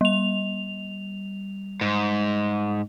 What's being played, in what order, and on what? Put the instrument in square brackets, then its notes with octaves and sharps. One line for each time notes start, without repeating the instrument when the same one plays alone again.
[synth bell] G3 F7
[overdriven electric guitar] G#2